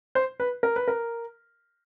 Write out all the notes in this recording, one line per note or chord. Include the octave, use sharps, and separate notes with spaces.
C5
B4
A#4
B4
A#4